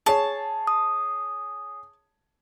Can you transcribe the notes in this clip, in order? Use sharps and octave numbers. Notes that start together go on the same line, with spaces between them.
G#4 C#5 A5
D#6